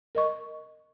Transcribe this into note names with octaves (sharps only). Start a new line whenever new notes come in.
A#4 D#5 C#6